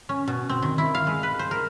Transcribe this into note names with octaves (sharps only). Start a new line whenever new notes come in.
C#4
B2
C4
D#3
E4
F5
G#3
B4
C5
A#4